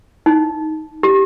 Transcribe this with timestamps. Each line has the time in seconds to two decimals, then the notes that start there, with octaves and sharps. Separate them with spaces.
0.26 D#4
1.03 G4